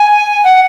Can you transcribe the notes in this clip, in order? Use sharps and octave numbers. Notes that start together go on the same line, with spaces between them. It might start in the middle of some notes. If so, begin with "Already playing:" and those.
Already playing: G#5
F#5